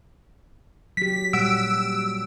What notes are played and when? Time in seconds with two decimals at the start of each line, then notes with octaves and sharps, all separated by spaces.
0.97 F#3 G4 B6
1.33 A#2 G3 F#5 E6 D7